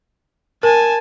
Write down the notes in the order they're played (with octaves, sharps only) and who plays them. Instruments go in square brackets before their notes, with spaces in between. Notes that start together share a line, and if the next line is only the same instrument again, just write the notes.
[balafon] A#4 [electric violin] G#5 A5